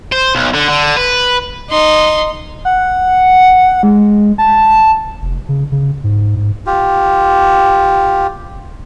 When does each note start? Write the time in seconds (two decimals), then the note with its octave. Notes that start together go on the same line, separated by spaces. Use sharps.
0.12 C5
0.35 B1
0.54 D3
0.69 D3
0.97 B4
1.69 D#4 C6
2.65 F#5
3.83 G#3
4.38 A5
5.22 F1
5.49 C#3
5.72 C#3
6.04 G#2
6.36 G#2
6.66 F4 G4